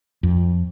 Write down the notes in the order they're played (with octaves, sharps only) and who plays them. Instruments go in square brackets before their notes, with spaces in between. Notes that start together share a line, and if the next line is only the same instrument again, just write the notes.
[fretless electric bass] F2